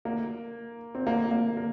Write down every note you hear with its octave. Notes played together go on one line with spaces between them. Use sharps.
A#3
C4
A#3
A#3
A#3